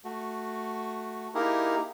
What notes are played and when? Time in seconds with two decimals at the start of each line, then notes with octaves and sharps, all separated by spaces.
0.05 A3 F#4
1.35 A#3 D#4 E4 G4 G#4 A#4